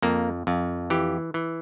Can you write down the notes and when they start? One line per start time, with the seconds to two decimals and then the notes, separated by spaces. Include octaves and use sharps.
0.02 F2 A#3
0.47 F2
0.90 E3 G4
1.34 E3